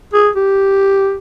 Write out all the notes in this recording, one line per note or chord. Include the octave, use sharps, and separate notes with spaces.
G#4
G4